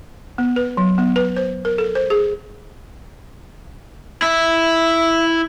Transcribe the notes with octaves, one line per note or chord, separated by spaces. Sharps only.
B3
B4
F#3
B3
B4
C5
A#4
A4
C5
G#4
E4 E5